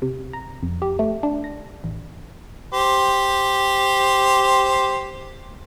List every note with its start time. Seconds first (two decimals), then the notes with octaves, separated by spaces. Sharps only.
0.02 C3
0.33 A#5
0.62 F2
0.82 G4
0.99 A3
1.23 D4
1.44 A#6
1.84 A1
2.72 G4 C5